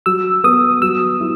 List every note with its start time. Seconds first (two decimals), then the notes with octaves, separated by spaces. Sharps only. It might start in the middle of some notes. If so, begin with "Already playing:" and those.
0.06 F#3 E6
0.44 B3 D#6
0.82 F#3 E6
1.20 E4